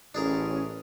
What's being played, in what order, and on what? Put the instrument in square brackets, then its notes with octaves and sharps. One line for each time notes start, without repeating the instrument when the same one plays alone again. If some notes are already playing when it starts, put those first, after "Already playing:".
[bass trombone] A1 [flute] C#4 [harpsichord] D4 G#4 A#4